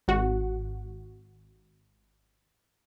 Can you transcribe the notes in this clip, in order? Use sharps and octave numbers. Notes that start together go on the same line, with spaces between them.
G#1 F#4 F#5